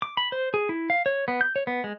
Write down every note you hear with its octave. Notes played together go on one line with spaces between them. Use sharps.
D6
B5
C5
G#4
E4
F5
C#5
B3
G6
C#5
B3
G#3